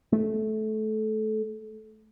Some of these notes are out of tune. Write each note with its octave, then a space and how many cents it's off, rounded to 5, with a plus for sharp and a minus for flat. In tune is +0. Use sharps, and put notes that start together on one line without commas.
A3 -20